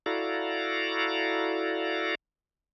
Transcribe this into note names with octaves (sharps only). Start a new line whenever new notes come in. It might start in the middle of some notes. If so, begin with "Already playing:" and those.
E4 F#4 A4 D5 F5 A#5